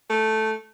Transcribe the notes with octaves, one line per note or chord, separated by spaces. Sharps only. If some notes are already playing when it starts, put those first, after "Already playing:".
A3